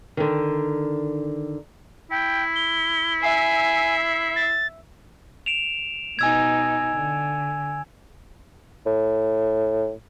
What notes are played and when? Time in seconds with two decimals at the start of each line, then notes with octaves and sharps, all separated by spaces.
0.17 D3 D#3
2.11 E4 G5
2.55 G7
3.22 E5 G#5 C7
4.36 A6
5.46 D7 E7 F7
6.19 B2 D#4 G#5 E6 G#6
6.94 D3
8.86 A2